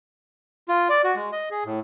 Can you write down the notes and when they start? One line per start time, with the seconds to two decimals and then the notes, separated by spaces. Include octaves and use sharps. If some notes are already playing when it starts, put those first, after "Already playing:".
0.68 F4
0.90 D5
1.04 F#4
1.15 G#3
1.32 D#5
1.51 G#4
1.65 A2